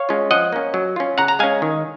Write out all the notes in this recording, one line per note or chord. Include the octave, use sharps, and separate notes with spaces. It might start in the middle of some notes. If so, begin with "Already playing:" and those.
Already playing: C#5 F5
G#3 C#4 F4
F3 D#5 F#5
A#3 C#4
F#3
C#4 F4
C#3 F#5 A#5
A#5
G#3 C#4 F5 G#5
D#3